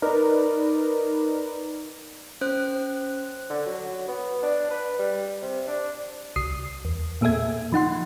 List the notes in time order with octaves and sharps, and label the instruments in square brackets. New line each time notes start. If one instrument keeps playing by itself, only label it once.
[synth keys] D#4 A#4 B4 D5
[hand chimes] C#4 C5 F#6
[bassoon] D3
F#3
B3
D4
B4
G3
C3
D4
[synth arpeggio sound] C2 D#6 C7
E2
A#2 A#3 G#4 A4 E5 G#6
F3 D#4 F#5 C6